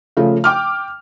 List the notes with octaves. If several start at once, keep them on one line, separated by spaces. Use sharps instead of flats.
C#3 F3 A3
G5 D6 F6